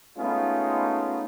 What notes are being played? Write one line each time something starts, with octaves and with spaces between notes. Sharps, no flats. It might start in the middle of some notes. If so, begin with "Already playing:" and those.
G#3 A3 B3 C#4 D#4 F4